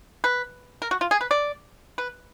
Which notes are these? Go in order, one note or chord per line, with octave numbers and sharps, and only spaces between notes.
B4
A#4
F#4
F4
G#4
B4
D5
B4